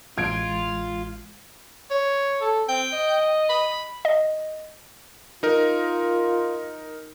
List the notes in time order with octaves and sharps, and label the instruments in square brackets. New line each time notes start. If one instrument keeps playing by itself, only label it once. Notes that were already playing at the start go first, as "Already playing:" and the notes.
[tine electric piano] A1 G#3 [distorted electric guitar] F4 [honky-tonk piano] G#6 D7
[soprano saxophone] C#5
[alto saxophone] A4
[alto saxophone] C4 [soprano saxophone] G5
[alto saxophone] D#5
[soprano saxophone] B5
[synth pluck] D#5
[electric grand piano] D#4 A#4 [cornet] F4